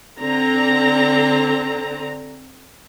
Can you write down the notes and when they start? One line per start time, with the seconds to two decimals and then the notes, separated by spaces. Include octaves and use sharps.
0.20 D3 C4 A#5